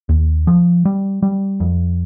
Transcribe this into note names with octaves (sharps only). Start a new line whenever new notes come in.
D#2
F3
G3
G3
F2